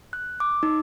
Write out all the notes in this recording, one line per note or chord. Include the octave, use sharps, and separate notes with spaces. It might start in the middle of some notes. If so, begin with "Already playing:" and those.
F#6
D6
D#4